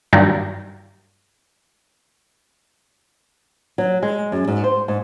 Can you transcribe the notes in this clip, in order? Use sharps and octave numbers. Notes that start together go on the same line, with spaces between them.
G2 A#2 D#3 F#3 G3
F#3
G#3
F#2
G#2
C5
G#2